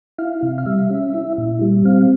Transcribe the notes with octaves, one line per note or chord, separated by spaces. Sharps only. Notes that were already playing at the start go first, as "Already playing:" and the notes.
E4 F5
C3
F5
G3 E5
C#4
E4
A#2
G3
C4 F5